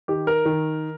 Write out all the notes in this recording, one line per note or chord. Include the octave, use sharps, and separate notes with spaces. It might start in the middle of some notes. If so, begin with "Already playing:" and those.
D#3 G4
A#4
D#3